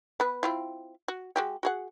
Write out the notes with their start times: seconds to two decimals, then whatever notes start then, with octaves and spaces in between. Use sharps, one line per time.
0.20 B3 B4
0.43 C4 E4 F4
1.08 F#4
1.36 G#3 F#4 G4
1.63 F#4 G#4 F#5